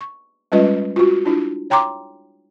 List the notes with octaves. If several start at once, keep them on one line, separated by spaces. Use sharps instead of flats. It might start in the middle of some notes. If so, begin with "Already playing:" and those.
C#6
G3 G#3 C#4 F4 B4 D#5
F4 F#4
D4 E4 F4
C#5 G5 A#5 C6 D6